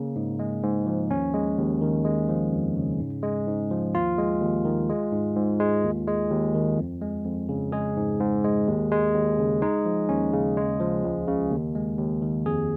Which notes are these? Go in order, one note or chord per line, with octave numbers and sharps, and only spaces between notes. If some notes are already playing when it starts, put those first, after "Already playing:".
Already playing: C#3 A#3
G#2
G#3
G#2
F3
D#2 C#4
G#3
D#2
D#3
G#3
F3
F2
C#3
G#2
G#3
G#2
F3
D#2 F4
G#3
D#2
D#3
G#3
G#2
G#2
G#3
D#2
G#3
D#2
D#3
F2
G#3
F2
C#3
G#3 G#4
G#2
G#2
G#3
D#2
G#3
D#2
C#3
G#3 D#4
F3
D#2 C#4
C#3
G#3
F3
C#2
C#3
D#2
G#3
D#2
D#3
F2 G#4